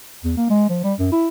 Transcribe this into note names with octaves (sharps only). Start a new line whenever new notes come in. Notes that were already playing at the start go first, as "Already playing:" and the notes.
E2
A#3
G#3
F3
G3
F#2
E4